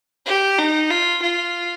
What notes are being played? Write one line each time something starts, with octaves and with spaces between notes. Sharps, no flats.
G4
D#4
F4
F4